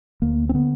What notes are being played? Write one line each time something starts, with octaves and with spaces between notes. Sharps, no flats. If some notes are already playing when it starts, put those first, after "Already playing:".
D2 A#3
C4
D3 B3